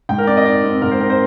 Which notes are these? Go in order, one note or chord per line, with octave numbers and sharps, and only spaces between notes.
G#2 G5
A#4
C4 D5
D#5
D#4 D5
C4
G#2 A#4
C5
C4 A#4
C5